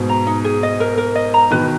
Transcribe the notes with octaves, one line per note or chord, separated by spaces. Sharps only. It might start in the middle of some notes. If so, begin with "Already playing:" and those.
Already playing: G#2 B2
A#5
D#4
G#4
D#5
A#4
A#4
D#5
A#5
B2 D#3 B4